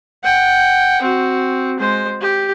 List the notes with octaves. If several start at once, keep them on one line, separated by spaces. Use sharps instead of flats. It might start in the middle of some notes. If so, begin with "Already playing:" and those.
F#5 G5
C4 F#4
G#3 C5
G4